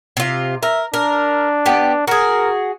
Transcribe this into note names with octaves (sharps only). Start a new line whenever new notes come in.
C3 F4
A#4 E5
D4 A#4
B3 G4
F#4 G#4 A#4